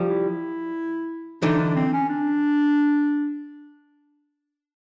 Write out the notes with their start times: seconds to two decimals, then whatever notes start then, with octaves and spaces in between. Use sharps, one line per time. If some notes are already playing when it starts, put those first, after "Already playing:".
Already playing: F3 G3
0.09 E4
1.42 D3 E3 D#4
1.59 D4
1.76 C4
1.93 C#4
2.09 D4